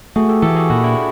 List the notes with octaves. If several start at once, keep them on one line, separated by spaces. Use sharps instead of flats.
A3 F#4 G#4
G4 A4
E3 G4 A4
F#4 G#4
A#2 E4 F#4
D4 E4